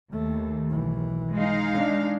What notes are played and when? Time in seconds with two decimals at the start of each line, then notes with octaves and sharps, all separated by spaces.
0.12 D#2 A3
0.70 B1 E3
1.33 G#3 D#4 F5
1.74 D4